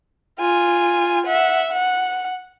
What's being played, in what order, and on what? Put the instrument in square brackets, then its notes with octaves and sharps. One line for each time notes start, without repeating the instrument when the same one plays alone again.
[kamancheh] F4 G#5
E5 F#5
F#5